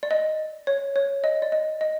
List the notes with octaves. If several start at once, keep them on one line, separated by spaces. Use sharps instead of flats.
D5
D#5
C#5
C#5
D#5
D5
D#5
D#5